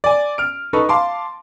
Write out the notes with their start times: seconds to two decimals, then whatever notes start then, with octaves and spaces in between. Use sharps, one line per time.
0.04 D5 G#5
0.38 F6 D7
0.73 D#4 A4 B4 C#6
0.89 F5 A5 C6 D6